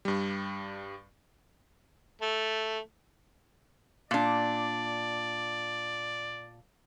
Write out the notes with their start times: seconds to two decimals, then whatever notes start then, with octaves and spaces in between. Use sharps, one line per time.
0.05 G2 G3
2.21 A3
4.11 A#2 D4 D5